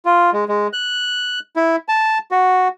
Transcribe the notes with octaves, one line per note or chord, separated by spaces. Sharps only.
F4
G#3
G#3
F#6
E4
A5
F#4